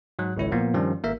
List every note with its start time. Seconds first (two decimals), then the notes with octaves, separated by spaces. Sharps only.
0.19 G#2 F#3 F#6
0.37 G#1 C#2 E4 C#5
0.52 A#2 F3 A#3 B3
0.74 G2 D#3 F3 G3 C#4
1.03 G#1 A#3 A#4 E5